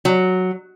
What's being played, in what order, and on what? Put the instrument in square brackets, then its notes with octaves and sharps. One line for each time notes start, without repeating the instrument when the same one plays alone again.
[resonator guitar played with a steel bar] F#3